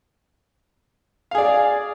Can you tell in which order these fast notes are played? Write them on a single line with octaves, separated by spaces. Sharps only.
F5 G#4 D5